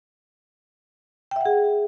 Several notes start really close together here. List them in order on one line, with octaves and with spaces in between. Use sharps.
G5 E5 F#5 G#4